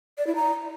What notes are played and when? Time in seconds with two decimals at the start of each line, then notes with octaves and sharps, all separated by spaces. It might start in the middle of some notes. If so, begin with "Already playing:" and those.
0.18 D5
0.27 E4
0.35 A#5